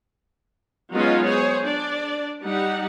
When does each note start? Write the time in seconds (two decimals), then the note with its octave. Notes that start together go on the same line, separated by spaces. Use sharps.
0.93 F#3 G#3 B3 C#4 D#4 F4
1.25 G#4 C5 C#5
1.64 D4 D5
2.44 G3 D#4 F#5